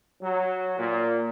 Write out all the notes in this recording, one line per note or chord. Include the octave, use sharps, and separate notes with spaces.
F#3
A#2